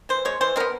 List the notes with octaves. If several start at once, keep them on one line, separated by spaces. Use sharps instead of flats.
E3 C5
G#3 B3 C#5
E3 C5
G#3 B3 A#4